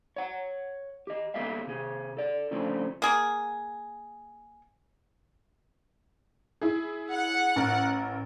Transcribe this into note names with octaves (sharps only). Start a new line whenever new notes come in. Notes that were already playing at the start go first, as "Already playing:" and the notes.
C#5 F#5
G4 D#5
A#3 B3 G4 A4 E5 F5
C3 G#4
A4 D5
C#3 F3 A3 C4 D4
A#3 G#4
E4 G#4
F#5
A1 A#4